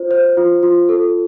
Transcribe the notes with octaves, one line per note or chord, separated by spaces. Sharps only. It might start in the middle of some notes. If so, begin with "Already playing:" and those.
Already playing: F4 C5
C5
F4
F4
A4